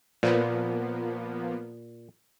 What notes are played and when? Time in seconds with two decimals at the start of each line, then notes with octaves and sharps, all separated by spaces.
0.23 A#2 F3 A#3 B3